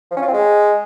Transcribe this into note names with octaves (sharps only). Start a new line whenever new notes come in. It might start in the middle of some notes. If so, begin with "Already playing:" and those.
F3
C#4
F4
C4
G#3